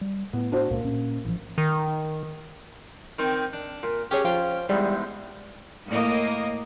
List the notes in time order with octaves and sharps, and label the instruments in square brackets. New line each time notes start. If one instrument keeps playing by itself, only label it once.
[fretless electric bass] G3
[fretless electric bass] A2 [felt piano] B3
[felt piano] D4 F#4 C5
[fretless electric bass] C#2 A#2 [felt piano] A#3
[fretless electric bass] A#2 C#4
A1 F3
[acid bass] D#3
[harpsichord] D#3 C4 D#4
D4
A#2
[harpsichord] C#4 [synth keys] G4 G#4 C#5
[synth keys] F3 F4 G5
[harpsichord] E2 G#2 [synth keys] G3
[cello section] A2 A#3 D#5